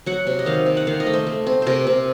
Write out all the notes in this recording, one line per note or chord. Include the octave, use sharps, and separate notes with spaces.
F#3 F#5
C3
D#5
D#3 F5
C3
F#5
D#3 F5
D#5
A3
C5
A3
C4
C3 A#4 C5
C3